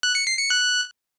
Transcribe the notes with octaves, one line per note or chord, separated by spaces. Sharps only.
F#6
C#7
C7
C#7
F#6